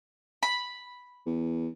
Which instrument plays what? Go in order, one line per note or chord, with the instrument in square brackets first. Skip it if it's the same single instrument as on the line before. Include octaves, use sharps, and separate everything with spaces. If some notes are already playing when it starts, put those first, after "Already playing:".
[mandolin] B5
[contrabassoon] E2